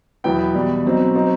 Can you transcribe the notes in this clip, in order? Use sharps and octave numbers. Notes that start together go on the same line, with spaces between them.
E2 B2 F#3 B3 E4 G5
E2 B2 G3
B2 F#3 C4 D#4
F#3 C4 D#4